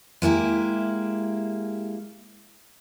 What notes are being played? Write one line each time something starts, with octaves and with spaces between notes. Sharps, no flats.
G#3 A#3 E4 G4